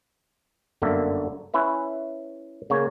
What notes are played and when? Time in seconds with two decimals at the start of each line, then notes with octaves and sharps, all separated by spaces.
0.82 G1 F#2 D3 A#3 E5
1.54 C#4 E4 B4 E5
2.70 C#3 A#3 C#5